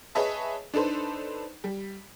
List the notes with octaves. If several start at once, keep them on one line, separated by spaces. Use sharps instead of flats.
G#4 B4 C#5 D#5 E5 A5
D4 D#4 A4 B4 C5
G3